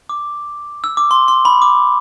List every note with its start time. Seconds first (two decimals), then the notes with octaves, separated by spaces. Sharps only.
0.09 D6
0.84 E6
0.97 D6
1.11 C6
1.28 C6
1.45 B5
1.62 D6